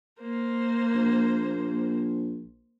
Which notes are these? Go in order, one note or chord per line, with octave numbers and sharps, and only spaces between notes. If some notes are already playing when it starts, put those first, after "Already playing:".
A#3 C5
A#1